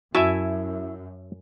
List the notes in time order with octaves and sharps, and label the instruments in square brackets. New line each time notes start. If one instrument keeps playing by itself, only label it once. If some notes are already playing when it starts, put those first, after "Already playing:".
[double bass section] F#2 [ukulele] E4 [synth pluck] F#4 [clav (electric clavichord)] E5 G#5 A5